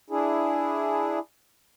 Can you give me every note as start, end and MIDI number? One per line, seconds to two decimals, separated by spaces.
0.10 1.19 62
0.10 1.19 64
0.10 1.19 68